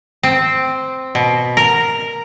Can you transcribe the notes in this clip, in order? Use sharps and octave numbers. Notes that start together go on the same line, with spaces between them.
C4
B2
A#4